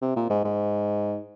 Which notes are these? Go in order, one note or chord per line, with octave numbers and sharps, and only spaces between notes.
C3
A#2
G#2
G#2